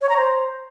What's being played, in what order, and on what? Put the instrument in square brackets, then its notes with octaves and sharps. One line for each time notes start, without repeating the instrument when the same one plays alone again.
[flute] C#5
A#5
C5